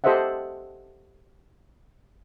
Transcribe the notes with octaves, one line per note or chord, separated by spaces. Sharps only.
G4 A4 C5 D#5 E5 F#5